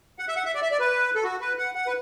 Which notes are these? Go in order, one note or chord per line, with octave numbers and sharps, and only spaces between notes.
F#5
E5
F#5
E5
D5
E5
D5
B4
A4
F#4
B4
F#5
F#5
B4